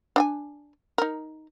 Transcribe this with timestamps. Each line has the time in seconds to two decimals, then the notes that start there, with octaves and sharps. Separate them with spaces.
0.16 D4 G5 G#5
0.98 D#4 A#4